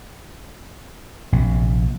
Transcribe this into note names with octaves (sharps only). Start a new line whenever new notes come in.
A#1 C3